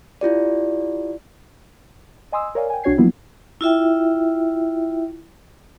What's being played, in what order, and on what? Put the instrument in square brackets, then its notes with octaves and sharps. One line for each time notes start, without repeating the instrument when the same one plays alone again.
[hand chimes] E4 F4 G4 D5
[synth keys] D#5 G#5 C6 D#6 E6
A#4 C#5 D5 F5 G#5
G5 G#5
C2 D4 F#4 C#5 G#6 C7
F3 F#3 A#3 B3 E4 F4
[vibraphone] E4 F4 E5 G5